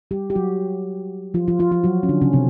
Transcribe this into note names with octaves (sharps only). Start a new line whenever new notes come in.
G3 G4
G4
F#3 F#4
F3 F4
F3 F4
F3 F4
F3 F4
F#3 F#4
C#4
D3 D4
C#3 C#4
C3 C4